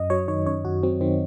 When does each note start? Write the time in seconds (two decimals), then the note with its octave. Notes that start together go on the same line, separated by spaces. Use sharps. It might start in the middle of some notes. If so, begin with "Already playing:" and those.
Already playing: F#2 D#5
0.10 F#3 C#5
0.28 D#3 C#5
0.46 F#2 C#5
0.65 F#2 F#4
0.83 F#3 C4
1.01 D#3 C4